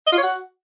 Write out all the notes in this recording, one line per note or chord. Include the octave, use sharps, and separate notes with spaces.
D#5
F4
C#5
F#4